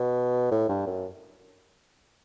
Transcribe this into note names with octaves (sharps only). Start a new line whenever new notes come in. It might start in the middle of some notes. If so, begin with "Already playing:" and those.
Already playing: B2
A2
G2
F#2